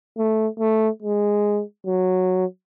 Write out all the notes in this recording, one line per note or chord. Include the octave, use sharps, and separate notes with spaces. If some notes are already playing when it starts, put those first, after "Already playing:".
A3
A3
G#3
F#3